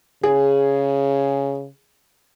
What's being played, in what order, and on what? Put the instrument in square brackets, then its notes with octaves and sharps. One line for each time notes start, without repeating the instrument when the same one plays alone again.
[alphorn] C#3 [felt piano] G#4